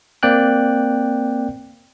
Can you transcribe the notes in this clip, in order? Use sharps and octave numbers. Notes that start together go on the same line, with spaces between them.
A#3 C4 D5 G5 F#6